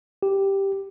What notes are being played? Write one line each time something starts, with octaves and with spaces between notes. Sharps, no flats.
G4